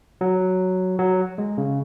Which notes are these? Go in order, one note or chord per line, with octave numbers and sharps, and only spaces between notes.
F#3
F#3
G#3
C#3